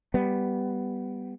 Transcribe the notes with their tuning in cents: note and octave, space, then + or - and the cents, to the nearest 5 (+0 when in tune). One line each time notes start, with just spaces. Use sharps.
G3 +0 B3 +0